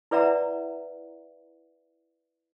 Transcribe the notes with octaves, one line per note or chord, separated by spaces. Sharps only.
E4 B4 D5 E5 F#5 A#5